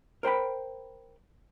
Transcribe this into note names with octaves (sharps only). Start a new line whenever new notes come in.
A#4 C5 G5 B5